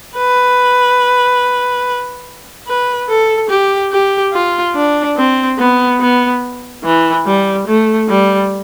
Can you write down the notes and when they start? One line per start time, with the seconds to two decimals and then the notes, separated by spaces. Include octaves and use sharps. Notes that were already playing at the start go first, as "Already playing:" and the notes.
0.17 B4
2.67 B4
3.09 A4
3.50 G4
3.92 G4
4.33 F4
4.75 D4
5.17 C4
5.58 B3
6.00 B3
6.84 E3
7.26 G3
7.67 A3
8.09 G3